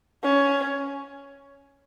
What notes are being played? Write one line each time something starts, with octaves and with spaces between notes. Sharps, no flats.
C#4